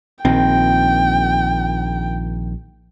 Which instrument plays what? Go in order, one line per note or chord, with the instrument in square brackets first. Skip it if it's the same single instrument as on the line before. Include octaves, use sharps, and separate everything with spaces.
[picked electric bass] A#1 D#3 C4 [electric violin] G5